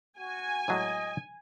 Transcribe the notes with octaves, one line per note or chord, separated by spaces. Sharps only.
F#4 G#5
A2 F#3 G#3 D#5